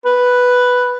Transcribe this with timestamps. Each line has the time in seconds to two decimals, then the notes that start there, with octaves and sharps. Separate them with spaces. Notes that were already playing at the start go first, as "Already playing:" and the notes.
0.05 B4